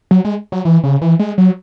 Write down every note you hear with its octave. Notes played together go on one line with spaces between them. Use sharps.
F#3
G#3
F#3
E3
C#3
E3
G#3
F#3